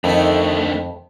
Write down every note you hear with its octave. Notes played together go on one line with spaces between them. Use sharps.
F2 D3 D#3 A3 D#4